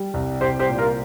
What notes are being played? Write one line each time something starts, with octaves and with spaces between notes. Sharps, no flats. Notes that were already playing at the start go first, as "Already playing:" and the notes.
Already playing: G3
C2
C2 G4 C5
G4 C5
A#2
F4 A#4